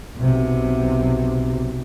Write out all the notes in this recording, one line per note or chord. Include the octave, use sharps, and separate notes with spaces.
B1 C3